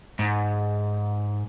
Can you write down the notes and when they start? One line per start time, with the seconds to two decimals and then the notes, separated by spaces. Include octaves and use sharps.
0.19 G#2